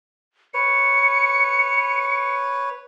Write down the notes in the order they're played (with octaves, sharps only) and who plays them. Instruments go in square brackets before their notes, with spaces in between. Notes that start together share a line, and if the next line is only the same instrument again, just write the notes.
[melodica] B4 C#5 [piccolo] C#7